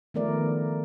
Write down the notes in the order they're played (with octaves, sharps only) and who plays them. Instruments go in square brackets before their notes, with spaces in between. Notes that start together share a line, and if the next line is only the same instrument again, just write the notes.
[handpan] D#3 F3 A3 B3 A#4 D5